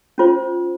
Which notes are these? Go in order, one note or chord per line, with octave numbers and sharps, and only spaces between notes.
C#4 F4 C5